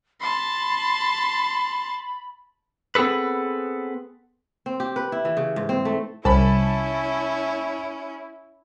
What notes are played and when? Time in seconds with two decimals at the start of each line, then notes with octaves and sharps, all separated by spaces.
0.20 A5 B5 C6
2.95 B3 C4 G#4 A4 B4
4.66 C4
4.80 G4
4.96 B4
5.12 E4
5.25 E3
5.37 C#3
5.56 G#2
5.69 C4
5.85 A3
6.25 C2 C#4 E4 A5 B5